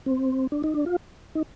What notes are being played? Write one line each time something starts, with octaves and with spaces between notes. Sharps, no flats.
C4
D4
D#4
D4
F4
D#4